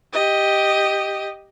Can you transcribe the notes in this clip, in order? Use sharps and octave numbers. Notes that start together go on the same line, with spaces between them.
G4 D#5